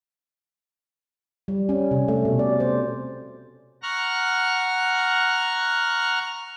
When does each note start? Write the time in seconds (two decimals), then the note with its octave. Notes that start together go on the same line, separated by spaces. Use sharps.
1.48 G3
1.69 C#4
1.91 C3
2.08 A3
2.25 B2
2.39 D5
2.60 C5
3.83 F#5 A#5 C#6 F6 F#6